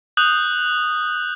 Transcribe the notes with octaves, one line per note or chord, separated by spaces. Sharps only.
D#6 F#6 G6 F#7